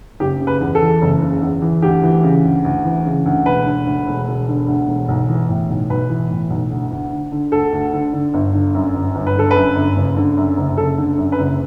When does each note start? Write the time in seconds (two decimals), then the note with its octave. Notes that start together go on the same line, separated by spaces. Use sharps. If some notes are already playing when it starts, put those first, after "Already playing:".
0.20 F#1 G4
0.40 C#3
0.47 B4
0.61 E2
0.75 A4
0.82 E3
1.02 F#1
1.22 C#3
1.42 E2
1.62 E3
1.82 D2 G4
2.03 E3
2.23 C#3
2.44 D2
2.65 D2
2.85 E3
3.05 C#3
3.26 D2
3.46 E1 B4
3.66 D3
3.86 D2
4.06 E1
4.27 E1
4.48 D3
4.68 D2
4.88 E1
5.08 B1
5.29 E3
5.49 A2
5.69 B1
5.90 B1 B4
6.10 E3
6.30 A2
6.50 B1
6.71 D2
6.91 D2
7.12 D3
7.32 D3
7.52 D2 A4
7.72 D2
7.93 D3
8.13 D3
8.34 G1
8.54 D3
8.74 F#2
8.94 G1
9.15 G1
9.27 B4
9.35 D3 A4
9.51 F#2 B4
9.75 G1
9.96 F#1
10.17 D3
10.37 F#2
10.57 F#1
10.78 F#1 A4
10.98 D3
11.18 F#2
11.32 B4
11.38 F#1